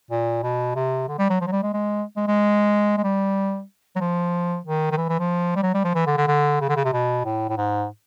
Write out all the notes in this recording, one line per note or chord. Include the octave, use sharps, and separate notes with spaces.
A#2
B2
C3
D3
G3
F#3
F3
F#3
G3
G#3
G#3
G#3
G#3
G#3
G3
F#3
F3
D#3
D#3
E3
E3
F3
G3
F#3
G3
F3
E3
D3
D3
D3
C#3
D3
C#3
C3
B2
A2
A2
G#2